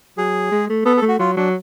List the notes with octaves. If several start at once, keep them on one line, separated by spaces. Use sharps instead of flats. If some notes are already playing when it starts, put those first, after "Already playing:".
F#3 G#4
G#3
A3
B3 A4
A4
A3
F#4
F#3 F4
F#3 D4